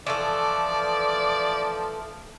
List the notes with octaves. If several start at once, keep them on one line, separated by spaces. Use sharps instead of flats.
E3 F3 A3 A4 D5